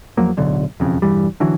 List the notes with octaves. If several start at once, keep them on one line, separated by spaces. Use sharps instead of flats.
E2 F3 F#3 A#3
D1 B1 D3
E1 F2 C#3
E1 G2 E3 G3
D3 E3 F#3